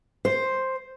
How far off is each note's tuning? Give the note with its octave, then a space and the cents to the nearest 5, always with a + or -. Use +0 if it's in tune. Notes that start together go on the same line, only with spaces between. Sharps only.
C5 +5